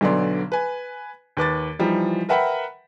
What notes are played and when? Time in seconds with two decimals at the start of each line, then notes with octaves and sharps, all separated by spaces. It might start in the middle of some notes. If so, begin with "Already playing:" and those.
0.01 B1 D3 F#3 B3 D5 C6
0.52 B4 G#5
1.37 D#2 B4 D6 A6
1.79 E3 F3 G3 D#4
2.29 A#4 B4 E5 F#5 G5 B5